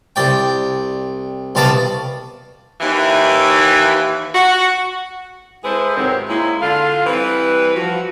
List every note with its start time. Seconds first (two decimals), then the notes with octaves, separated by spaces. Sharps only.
0.16 C2 D5 G5
1.55 C2 B2 F5 A5 B5 D6
2.81 D#2 E3
4.34 F#4
5.64 G#3 E4 G#4 A4 B4 C5
5.96 G#2 C3 D#3 F#3 C4
6.29 G#3 A#3 C#4 E4
6.61 D3 F4 F5
7.06 E3 G3 C4 B4
7.76 F3 F#4